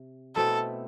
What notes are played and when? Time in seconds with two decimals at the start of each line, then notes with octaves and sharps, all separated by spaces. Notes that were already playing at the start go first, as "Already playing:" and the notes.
Already playing: C3
0.36 B2 A3 C4 E4 A4